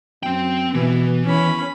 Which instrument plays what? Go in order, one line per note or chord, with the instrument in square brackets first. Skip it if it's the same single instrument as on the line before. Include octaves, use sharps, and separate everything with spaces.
[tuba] F#2 [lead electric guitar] C4 G5
[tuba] B2 [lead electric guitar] E3 [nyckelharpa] B3
[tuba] E2 [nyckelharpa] C#4 B5